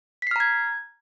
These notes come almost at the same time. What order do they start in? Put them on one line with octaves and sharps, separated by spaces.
B6 C7 F6 A#5 G#6